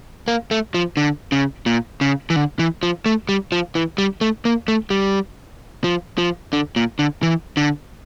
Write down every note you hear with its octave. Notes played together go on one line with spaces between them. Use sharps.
A#3
A3
F3
D3
C#3
A#2
C#3
E3
D3
E3
F3
A3
G3
F3
E3
G3
A3
A#3
A3
G3
F3
F3
D3
A#2
D3
E3
D3